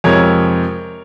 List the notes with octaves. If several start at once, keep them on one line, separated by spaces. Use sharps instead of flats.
F2 C3 F3 G#3 A#4 C#5